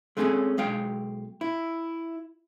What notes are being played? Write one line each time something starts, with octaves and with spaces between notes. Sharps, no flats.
G#3 A3 C4 C#4 G4 G#4
B1 G#3 F5 G5
E4